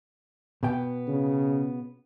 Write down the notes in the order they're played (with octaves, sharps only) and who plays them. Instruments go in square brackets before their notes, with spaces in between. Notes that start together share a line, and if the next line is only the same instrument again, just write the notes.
[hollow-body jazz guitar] B2 B3 G5
[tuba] C#3